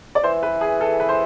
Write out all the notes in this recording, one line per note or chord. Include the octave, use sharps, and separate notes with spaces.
D5
E3 C5
B4
G#4
A4
B4
C5